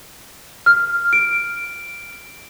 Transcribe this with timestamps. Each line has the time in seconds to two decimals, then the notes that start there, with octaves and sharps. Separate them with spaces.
0.66 F6
1.13 D7